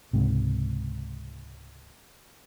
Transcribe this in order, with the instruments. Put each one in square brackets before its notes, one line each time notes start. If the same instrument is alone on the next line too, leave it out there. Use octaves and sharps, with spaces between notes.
[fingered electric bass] C#2 G#2 C3